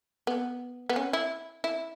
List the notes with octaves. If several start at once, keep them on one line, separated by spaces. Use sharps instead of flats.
B3
B3
C#4
E4
E4